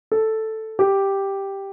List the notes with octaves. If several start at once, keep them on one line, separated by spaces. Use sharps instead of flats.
A4
G4